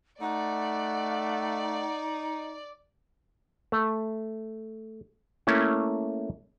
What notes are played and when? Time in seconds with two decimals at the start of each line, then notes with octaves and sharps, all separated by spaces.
0.21 A3 D#4 D5 F#5
3.72 A3
5.47 A3 A#3 C#4 E4